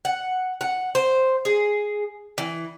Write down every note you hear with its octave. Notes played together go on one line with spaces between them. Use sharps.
F#5
F#5
C5
G#4
E3